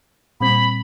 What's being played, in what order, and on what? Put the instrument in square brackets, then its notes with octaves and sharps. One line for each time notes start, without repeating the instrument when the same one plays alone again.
[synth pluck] A#2 G3 C4 [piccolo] B5